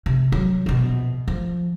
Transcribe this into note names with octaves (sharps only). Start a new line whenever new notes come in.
C3
F#3
A#1 B2
F3